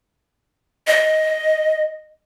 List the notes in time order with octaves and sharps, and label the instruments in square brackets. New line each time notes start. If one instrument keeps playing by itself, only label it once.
[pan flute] D#5